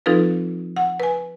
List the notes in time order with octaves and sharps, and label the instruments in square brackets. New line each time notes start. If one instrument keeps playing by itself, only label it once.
[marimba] F3 C4 D#4 F4 A4 B4
F#5
B4 G#5